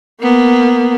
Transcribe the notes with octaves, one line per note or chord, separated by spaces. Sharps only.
A#3 B3